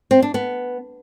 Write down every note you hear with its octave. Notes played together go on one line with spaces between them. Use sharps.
C4
D4
B3